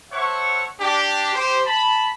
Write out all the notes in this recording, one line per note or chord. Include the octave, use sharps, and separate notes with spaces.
A4 C5 C#5 E5 F#5 C#6
D4 G4
G4 C5
A5 B5